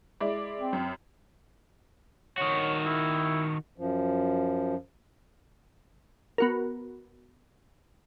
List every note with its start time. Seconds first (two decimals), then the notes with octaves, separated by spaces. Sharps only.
0.20 G#3 E4 D5
0.59 C4
0.73 F#2
2.38 D#3 F#4 C#5
2.86 E4
3.78 F#2 F3
6.38 B3 F#4 A#4